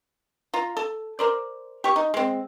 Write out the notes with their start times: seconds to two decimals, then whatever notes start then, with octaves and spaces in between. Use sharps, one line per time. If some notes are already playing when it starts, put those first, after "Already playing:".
0.54 F4 A#5
0.77 A4
1.19 A#4 C5 D5
1.84 G4 C#6
1.96 D#4
2.14 G#3 C4